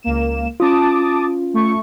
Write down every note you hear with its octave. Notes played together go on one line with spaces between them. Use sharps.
C#2 A#3 E7
C#4 F4 A5 D6 D#6
A3 C#6